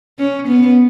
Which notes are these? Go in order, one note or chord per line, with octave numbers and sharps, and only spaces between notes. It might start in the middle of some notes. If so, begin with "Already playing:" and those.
C#4
B3